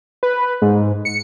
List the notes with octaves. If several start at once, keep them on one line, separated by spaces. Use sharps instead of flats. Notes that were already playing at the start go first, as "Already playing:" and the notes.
B4
G#2
C#7